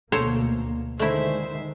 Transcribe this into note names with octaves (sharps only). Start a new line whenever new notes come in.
D2 B2 A#3 A4 C5 C#5
D3 D#3 G#3 A3 E4 C5 E5